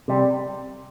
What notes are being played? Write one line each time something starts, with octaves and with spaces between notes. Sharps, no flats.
C3 G3